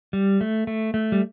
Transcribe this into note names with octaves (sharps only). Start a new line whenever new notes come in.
G3
A3
A3
A3
G3